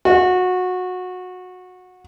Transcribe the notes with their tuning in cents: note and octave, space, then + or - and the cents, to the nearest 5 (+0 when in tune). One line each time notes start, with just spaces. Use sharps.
F#4 -20